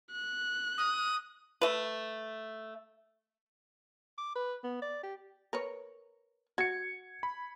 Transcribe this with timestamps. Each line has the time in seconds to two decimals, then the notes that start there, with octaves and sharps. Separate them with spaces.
0.12 F#6
0.78 D#6
1.61 A3 B4
4.18 D6
4.36 B4
4.64 B3
4.82 D5
5.03 G4
5.53 A#4 B4 C#5
6.58 F#4 G#6 C#7
7.23 B5